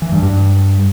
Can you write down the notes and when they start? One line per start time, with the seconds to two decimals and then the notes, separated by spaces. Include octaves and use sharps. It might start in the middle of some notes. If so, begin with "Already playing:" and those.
0.02 E3
0.12 G2
0.22 G2